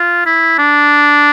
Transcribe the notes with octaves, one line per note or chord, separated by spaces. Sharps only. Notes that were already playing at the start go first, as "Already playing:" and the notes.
Already playing: F4
E4
D4